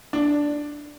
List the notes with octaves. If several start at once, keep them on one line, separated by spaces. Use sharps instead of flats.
D4